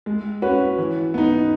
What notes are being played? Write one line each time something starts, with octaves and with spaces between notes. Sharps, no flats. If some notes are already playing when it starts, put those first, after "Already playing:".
G#3
C#4 F#4 B4
E3
B3 D#4